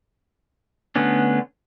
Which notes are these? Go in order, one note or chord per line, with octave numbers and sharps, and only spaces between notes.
D3 A3 B3 C#4 D4